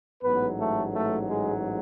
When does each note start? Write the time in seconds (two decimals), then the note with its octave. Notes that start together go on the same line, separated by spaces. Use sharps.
0.23 A1 G#2 F#3 B3 B4
0.59 A3 A4
0.94 A3 A4
1.29 G#3 G#4